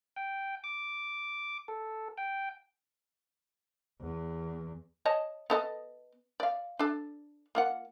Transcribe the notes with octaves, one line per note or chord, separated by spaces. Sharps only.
G5
D6
A4
G5
E2
C#5 D#5 A5
B3 A4 D#5
D5 F5
D4 A4
A#3 F4 F#5